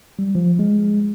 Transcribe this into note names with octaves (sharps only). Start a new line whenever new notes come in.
G3
F3
G#3